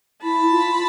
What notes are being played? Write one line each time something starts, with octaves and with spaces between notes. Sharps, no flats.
E4 A5 B5
F4